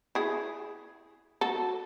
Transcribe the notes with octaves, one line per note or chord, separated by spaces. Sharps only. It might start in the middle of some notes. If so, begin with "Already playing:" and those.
E4 G#4
F#4 A4